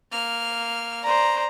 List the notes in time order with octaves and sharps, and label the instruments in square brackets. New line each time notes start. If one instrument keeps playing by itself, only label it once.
[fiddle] A#3 F6
[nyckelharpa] C5 D5 [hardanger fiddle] A#5